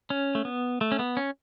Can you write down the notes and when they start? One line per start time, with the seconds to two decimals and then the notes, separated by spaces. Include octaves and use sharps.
0.10 C#4
0.35 A3
0.45 B3
0.81 A3
0.92 C#4
0.99 B3
1.17 C#4